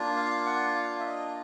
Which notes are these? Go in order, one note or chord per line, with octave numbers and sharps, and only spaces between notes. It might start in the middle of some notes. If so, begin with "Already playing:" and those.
Already playing: A#3 D4 F4
F5
F#5
F5
E5
D#5